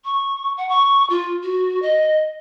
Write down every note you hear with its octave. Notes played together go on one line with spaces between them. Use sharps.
C#6
F#5
C#6
F4
F#4
D#5